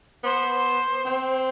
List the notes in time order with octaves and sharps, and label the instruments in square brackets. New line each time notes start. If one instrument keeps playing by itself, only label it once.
[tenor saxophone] B3 [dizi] C5
[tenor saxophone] C4